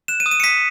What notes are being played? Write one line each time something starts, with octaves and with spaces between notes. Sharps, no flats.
F#6 E7
D#7
D#6
D#7
C#7
D#6 B6